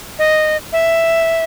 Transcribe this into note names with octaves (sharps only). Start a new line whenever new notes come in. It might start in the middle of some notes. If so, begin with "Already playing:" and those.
D#5
E5